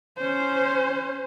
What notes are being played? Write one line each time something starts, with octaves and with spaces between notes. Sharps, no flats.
C#4 C5